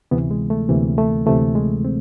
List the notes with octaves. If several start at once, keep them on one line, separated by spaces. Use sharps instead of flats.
D2 C3 E3 B3
G#3
A3
D2 C3 E3 A#3
A3
D2 C3 E3 A3
G#3
C4